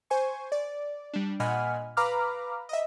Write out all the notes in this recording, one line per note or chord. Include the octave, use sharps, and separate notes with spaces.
C5 G#5 C#6
D5
G3 D4
A#2 D#5 F#5 G#5 B5 F6
B4 F5 A#5 B5 D6 F6
D#5 E5